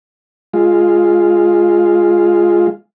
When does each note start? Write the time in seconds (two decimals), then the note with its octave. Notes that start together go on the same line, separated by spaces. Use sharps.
0.53 G#3 F4